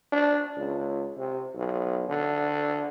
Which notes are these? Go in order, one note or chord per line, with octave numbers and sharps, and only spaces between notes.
D4
C#2
C3
B1
D3